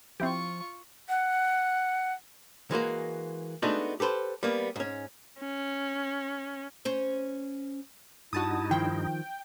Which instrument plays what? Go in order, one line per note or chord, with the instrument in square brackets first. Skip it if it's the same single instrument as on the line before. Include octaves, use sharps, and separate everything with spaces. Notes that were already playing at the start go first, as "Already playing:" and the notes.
[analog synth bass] F3 [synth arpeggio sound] C4 E4 G4 [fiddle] F4 C#6
[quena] F#5
[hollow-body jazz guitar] E3 G#3 A#3 F#4
G#3 A3 B3 D4 D#4 F#4
G4 A4 B4 C5
G3 A#3 B3
G#2 C#4
[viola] C#4
[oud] C#4 C5
[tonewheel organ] G2 D#4 [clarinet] E4 [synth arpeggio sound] F#4 A5 D#6
[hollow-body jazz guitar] D#3 F3 [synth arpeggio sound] G5